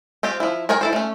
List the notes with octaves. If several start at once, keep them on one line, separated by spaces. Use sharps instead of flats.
C4 F4 G4
F3 E4
G#4 A#4 C#5 G5 G#5
E4 A4 C5
A3 C#4